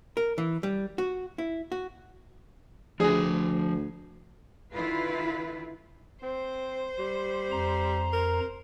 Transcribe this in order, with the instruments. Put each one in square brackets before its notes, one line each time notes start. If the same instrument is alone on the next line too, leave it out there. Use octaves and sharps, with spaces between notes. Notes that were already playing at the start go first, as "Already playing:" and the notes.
[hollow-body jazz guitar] A#4
E3
G3
F#4
E4
F#4
[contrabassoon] D2 [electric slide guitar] F3 G#5 [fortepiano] G#4
[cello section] D3 D#3 E4 F4 B4
[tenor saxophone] C4 [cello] C5
[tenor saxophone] G3
[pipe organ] F2 A#5
[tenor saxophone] A#4